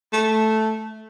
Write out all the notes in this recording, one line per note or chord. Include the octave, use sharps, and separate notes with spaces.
A3